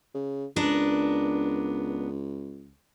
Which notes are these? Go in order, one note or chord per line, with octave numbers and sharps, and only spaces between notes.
C#3
C#2 B3 D4 A#4